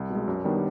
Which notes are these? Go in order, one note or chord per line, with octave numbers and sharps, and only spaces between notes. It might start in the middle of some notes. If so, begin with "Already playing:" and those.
Already playing: C2
B2 G#3
F#2
D#3 G3 B3 D4